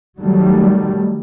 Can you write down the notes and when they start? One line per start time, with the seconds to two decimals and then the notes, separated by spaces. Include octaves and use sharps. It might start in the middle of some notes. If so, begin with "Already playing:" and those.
0.18 D#3 F#3 G3 A3